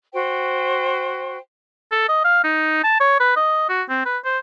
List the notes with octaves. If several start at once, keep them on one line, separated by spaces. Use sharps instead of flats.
F#4 C5 G5
A4
D#5
F5
D#4
A5
C#5
B4
D#5
F#4
C4
B4
C5